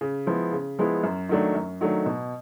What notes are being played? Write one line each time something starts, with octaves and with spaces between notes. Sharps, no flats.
C#3
F3 G#3 B3 E4
C#3
F3 G#3 B3 E4
F#2
D#3 F#3 A3 D4
F#2
D#3 F#3 A3 D4
B2